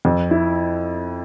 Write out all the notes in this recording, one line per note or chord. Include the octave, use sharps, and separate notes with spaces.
F2
E4